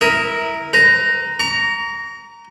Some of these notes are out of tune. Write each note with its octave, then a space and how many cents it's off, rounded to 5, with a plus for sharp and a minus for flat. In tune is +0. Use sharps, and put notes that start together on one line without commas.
E4 -15 A#4 +0 D#6 +20
B4 +40 A#5 +0
A#5 +0 C#6 +45